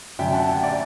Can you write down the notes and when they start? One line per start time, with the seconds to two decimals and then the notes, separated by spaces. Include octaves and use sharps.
0.19 F#2 D3 E5 G5
0.33 F#5 A5
0.49 E5 G5
0.63 D5 F#5